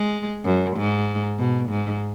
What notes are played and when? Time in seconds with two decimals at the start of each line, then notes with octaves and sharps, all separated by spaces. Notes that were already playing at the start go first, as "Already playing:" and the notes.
Already playing: G#3
0.45 F#2
0.77 G#2
1.39 B2
1.70 G#2